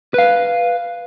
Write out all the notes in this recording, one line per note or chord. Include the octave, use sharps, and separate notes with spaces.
B4 F5